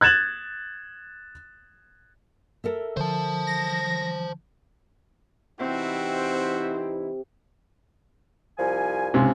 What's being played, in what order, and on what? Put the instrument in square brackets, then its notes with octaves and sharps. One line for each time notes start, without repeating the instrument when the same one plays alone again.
[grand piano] F#6 G#6 A6 E7 F#7
[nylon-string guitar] A4 A#4 E5
[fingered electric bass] D3 F3 [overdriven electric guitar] C5 A5
[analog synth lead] A#6
[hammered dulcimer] C3 [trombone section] E3 D#4 E4 [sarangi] C4 [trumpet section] F#4 C5 E5
[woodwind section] C2 F3 G#5
[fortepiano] C#2 G#2 C3